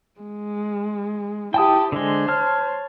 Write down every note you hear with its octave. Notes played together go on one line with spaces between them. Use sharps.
G#3
E4 G4 G5 A5 D#6
D3 G#3 C5
C#5 A5 F6